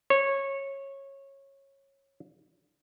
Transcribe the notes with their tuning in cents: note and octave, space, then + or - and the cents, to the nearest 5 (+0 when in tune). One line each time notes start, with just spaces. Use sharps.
C#5 -15